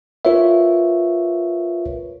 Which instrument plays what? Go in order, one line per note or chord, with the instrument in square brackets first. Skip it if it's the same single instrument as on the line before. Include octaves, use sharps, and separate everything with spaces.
[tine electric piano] F4 A#4 B4 C#5 E5